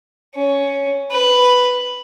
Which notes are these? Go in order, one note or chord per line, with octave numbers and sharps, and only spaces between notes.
C#4
B4